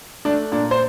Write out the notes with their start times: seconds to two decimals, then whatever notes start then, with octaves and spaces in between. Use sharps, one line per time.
0.25 A3 D4
0.52 A#2 D4
0.71 C5